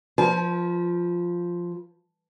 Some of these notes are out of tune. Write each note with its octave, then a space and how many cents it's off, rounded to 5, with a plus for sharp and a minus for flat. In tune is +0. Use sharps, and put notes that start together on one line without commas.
F3 +0 B4 -35 A5 -45